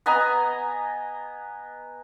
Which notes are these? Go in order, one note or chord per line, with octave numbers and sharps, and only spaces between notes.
B3 D#5 G#5 A#5